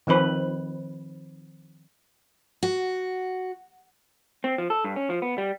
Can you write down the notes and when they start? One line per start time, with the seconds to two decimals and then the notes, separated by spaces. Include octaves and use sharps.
0.07 D#3 F3 C4 B4
2.63 F#4
4.44 C4
4.58 F3
4.70 A4
4.85 G2
4.96 C#4
5.10 F3
5.22 B3
5.38 G3